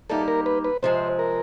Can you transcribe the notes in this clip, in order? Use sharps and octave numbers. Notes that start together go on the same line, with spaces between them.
G3 A#3 D#4 G4 A4
A#4
B4
B4
C3 F3 G#3 C5
A#4